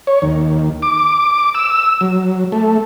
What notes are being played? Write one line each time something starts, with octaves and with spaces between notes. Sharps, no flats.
C#5
D#2
D6
E6
F#3
A3